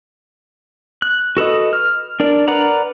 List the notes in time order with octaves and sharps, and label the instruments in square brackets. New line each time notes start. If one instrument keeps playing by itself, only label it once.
[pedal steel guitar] F#6
F#4 A4 B4 D#5
F6
D4 A#4 D5
A#4 B4 D5 F#5 A#5